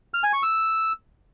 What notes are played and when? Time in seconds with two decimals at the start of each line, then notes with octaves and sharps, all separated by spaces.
0.14 F6
0.24 G#5
0.33 C#6
0.43 E6